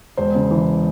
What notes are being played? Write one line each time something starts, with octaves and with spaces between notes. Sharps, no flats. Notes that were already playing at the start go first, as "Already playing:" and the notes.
E1 C5
C#3
E3